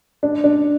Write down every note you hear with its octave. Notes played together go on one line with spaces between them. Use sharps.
D4
D4